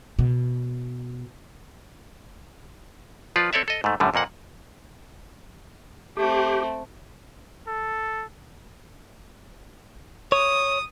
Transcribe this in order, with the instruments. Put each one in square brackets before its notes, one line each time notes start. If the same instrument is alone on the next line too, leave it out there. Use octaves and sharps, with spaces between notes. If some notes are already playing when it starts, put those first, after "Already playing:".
[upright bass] B2
[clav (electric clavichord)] F3 F4 B4 D5
C4 A4 C#5 D5 E5
A4 D#5
G#2 A3
F#2 A2 D3 G3
F2 A#2 A#3 F#5
[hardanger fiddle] A3 C4 [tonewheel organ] G4
[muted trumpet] A4
[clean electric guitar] C#5 [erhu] D#6